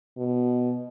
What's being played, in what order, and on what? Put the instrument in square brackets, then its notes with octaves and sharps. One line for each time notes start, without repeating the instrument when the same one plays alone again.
[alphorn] B2